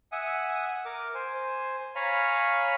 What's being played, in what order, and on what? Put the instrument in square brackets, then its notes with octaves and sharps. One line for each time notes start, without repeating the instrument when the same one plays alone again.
[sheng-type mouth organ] E5 F#5 G#5 D#6
A#4 D6
C5 G#5
C#5 F5 G#5 A#5 B5